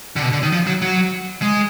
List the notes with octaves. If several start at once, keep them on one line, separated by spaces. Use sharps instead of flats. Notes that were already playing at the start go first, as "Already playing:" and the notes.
D3
B2
D3
D#3
F3
F#3
F#3
G#3